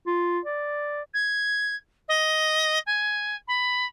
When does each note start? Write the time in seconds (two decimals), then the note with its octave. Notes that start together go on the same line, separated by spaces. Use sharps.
0.07 F4
0.45 D5
1.14 G#6
2.08 D#5
2.86 G#5
3.48 B5